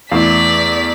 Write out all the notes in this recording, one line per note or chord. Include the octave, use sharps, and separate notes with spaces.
E2 A3 E4 D5 F5 B6